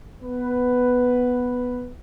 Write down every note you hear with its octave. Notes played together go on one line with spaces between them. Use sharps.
B3 B4